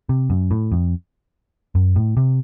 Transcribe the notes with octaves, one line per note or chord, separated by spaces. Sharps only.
C3
F#2
A2
F2
F#2
A2
C3